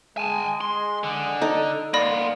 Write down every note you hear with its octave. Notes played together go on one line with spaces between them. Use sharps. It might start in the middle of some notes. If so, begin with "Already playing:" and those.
G#3 G#5 A5
C6
D3
D#4 A4
A#3 B3 D5 B5 C6 A#6